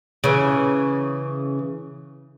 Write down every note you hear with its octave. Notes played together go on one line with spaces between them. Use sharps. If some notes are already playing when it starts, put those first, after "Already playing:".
C#3 E3